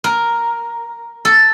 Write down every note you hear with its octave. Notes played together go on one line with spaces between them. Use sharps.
A#4
A4